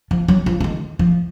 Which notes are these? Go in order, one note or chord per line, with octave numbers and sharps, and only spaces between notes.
F3
F#3
F3
F3
D#3
F3